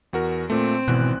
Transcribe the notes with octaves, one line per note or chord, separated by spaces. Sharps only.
E2 F#4 A#4
A#2 A3 C4
G#1 B2 E3 F#6